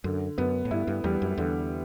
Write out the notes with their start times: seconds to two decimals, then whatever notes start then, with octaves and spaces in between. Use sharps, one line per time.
0.04 F#2 D3
0.38 F#2 B3
0.65 A2
0.71 G2 E4
0.87 G2
1.04 E2 G3
1.22 F#2
1.38 E2 D3